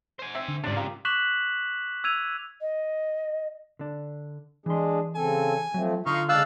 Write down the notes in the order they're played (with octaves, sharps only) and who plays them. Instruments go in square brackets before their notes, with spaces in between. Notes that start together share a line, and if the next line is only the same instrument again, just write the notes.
[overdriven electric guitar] C5 G#5
[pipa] C4 E5
[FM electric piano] D3
[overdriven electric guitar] C#2 C3 [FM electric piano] G#2 C7 [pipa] D4 D5
[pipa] G4 A#4 [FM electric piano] F5
[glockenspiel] C#6 D6 F#6 B6 E7 F#7
E6 G#6 D#7 F7
[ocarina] D#5
[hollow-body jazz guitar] D3 D4
[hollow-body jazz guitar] E3 C6 [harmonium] G#3 D4 G#4
[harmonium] C#3 C4 A4 [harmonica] G#5
[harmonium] F3 A3 C4 [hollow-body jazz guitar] F#3
[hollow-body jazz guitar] D3 [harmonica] D#4 F5 C#6 [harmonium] F4
[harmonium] C#3 G#3 [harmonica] D4 A5 [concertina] F5 E6 F#6